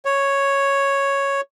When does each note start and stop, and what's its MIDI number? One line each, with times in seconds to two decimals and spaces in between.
0.05 1.41 73